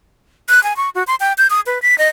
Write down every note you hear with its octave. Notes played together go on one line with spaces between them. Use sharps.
F#6
G#5
C#6
F#4
C6
G5
G6
D#6
B4
B6
D#5